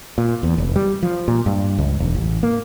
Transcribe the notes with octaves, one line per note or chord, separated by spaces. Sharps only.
A#2
E2
F1
G3
F3
A#2
G2
C#2
E1
A1
A#3